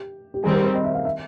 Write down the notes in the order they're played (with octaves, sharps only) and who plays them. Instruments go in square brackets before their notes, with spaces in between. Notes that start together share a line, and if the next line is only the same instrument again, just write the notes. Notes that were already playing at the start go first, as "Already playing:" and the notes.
Already playing: [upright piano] G4
G4
[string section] D#3 G3 C4 [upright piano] G#4
[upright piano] A#4
C5
D#5
E5
F5
E5